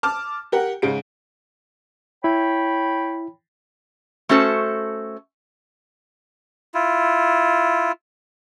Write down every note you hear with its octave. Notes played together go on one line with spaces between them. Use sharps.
A5 D6 F6
G4 A#4 F#5
G#2 C#3 D7
E4 C#5 G5 B5
A3 C#4 F#4 A4 C5 A5
E4 F4